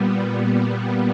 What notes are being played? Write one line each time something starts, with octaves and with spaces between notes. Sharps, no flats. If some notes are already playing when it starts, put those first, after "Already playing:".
Already playing: A#2 G3 B3